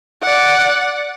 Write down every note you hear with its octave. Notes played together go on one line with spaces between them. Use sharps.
D5 F#5